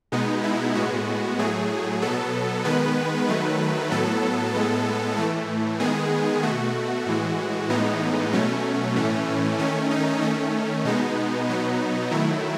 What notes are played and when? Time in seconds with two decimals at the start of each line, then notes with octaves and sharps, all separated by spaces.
0.12 B2 G#3 B3 D#4
0.44 E4
0.75 A2 G#3 B3 F#4
1.39 A2 F#3 A3 G#4
2.01 B2 F#3 B3 A4
2.64 D#3 G#3 B3 B4
3.28 D#3 F#3 A3
3.91 A2 F#3 B3 A4
4.55 A2 G#3 B3
5.17 A2 E3 A3
5.80 D#3 G#3 B3 G#4
6.43 B2 A3 F#4
7.06 A2 E3 G#3
7.69 A2 E3 G#3 B3 D#4
8.32 B2 F#3 A3 C#4
8.96 A2 E3 A3
9.58 D#3 A3 C#4
9.91 D#4
10.21 D#3 A3 C#4
10.85 B2 G#3 B3 D#4
11.49 B2 F#3 B3
12.11 D#3 F#3 A3 E4